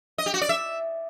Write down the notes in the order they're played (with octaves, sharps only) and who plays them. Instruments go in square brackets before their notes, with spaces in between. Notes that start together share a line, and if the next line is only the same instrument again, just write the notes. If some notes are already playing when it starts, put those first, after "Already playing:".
[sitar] D#5
G4
F#4
D5
E5